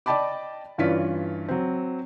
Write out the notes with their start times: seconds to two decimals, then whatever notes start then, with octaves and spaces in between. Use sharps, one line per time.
0.06 D5 D#5 G5 A5 B5 D6
0.78 G2 E3 C#4 F4 D5 B6
1.48 F#3 C4